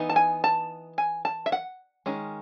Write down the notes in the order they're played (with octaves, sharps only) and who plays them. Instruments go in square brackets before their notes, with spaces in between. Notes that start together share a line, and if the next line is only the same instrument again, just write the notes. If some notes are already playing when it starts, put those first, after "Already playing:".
Already playing: [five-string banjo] E3 B3 D#4
A5
G#5
A5
G#5
A5
E5
F#5
D#3 G#3 C#4